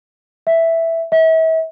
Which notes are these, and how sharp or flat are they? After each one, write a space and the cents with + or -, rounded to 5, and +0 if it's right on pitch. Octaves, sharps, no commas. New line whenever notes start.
E5 +0
E5 -40